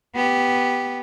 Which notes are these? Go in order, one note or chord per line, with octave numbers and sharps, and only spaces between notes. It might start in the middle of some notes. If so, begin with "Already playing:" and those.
B3 G4